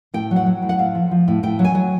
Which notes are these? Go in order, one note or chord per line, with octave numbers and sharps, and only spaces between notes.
A2 G5
F#3
F#5
F#3
A2
F#5
A2 F5
F3
F3
A2
A2 G5
F#3
G#5
F#3